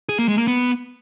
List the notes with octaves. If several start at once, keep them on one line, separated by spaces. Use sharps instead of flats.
G#4
A#3
G#3
A#3
B3